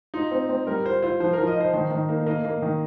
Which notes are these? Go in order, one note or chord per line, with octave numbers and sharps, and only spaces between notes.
D#4 F4
C4
C4
G3 A#4
F4 C5
F4 C5
F3 C5
A#4
F3
D#5
D#4 C5
D#3 C5
D#3
A#3
A#3 D#5
A#3
D#3